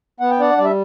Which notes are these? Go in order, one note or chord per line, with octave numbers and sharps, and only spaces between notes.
B3 F#5
G5
D4 D5 F#5
G3 D5
E5